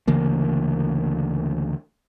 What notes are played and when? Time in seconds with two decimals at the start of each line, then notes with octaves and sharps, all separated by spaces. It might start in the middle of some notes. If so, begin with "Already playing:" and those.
0.07 D2 C#3 E3 A#3